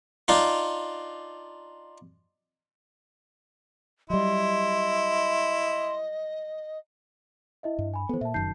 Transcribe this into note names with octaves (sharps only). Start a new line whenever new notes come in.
D4 D#4 F4
F#3 G3 E4 D#5 C6
E4 D#5 E5
G2
G#5 B5
E3 B3 A4 C5
A#2 E5 A5
F1 F#2 D#3 A5 G6 C7